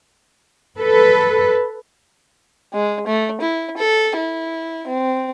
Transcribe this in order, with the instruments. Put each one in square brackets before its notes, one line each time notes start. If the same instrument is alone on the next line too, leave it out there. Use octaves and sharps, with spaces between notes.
[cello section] A4 B4
[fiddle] G#3
A3
E4
A4
E4
C4